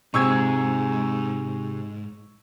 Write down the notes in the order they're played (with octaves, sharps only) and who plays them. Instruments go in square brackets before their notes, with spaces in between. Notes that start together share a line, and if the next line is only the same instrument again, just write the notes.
[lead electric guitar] G#2 [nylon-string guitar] C3 F4 [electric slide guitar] D#4 G#4 [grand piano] C#6 E6 G#6